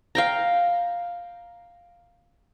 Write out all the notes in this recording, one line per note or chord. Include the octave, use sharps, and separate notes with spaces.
F5 G5 A#5